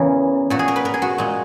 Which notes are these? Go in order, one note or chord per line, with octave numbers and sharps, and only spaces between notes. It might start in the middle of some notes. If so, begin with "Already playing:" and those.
Already playing: E2 C#3 E3 A#4
A#2 F#4
G#4
A#4
B4
A#4
G#4
F#4
A#2 G#3